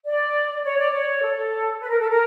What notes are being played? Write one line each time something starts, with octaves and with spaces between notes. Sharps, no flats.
D5
C#5
D5
C#5
A4
B4
A#4
A4
A#4